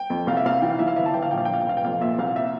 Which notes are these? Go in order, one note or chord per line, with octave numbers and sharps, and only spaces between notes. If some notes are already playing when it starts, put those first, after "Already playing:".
Already playing: G5
F2
C2 F5
E5
C2 F5
E3 G5
F5
E3 E5
F5
G1 E5
A5
G1 G5
F5
A#1 G5
F5
G5
A#1 F5
G5
F1 F5
G5
F2 F5
A#2 E5
C2 F5
E5